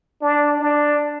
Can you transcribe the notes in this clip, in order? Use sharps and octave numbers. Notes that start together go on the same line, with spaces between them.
D4
D4